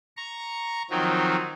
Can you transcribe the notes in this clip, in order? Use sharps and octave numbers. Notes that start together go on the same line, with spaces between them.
A#5 C#6
D#3 F3 F#3 C4 D#4